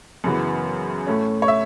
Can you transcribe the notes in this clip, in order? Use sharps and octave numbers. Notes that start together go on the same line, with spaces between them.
F#2 C#3 E3 B3
A2 A3 C#4
C#5
E5